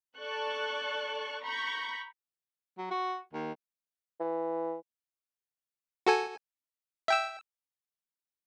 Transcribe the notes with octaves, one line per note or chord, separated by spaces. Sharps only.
A4 D5 A5 C#6 F#6
A#5 B5 C#6 G6
F#3
F#4
D#2
E3
F#4 A4 G#5
E5 G5 E6